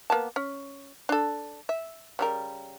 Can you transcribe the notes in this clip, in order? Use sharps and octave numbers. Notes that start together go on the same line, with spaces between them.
A#3 B3 A5
C#4
D4 A4
E5
C#3 G3 A#4